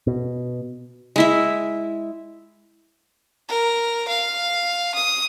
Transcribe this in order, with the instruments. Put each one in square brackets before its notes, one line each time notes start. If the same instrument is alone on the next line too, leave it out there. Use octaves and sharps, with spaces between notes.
[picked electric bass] B2
[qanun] G#3 E4 E5
[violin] A#4
F5
D#6